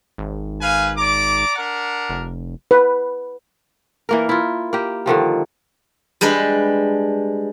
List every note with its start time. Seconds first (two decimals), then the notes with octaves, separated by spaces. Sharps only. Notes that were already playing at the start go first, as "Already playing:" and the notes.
0.18 G#1
0.61 B4 F5 G#5
0.98 D5 A#5 D6
1.56 D4 A#4 F#5
2.10 F1
2.71 B4
4.09 E3 A#3 A#4
4.29 E4 F4
4.73 A#3 G4
5.06 D3 D#3 F3 G3
6.21 G3 G#3 D4 B4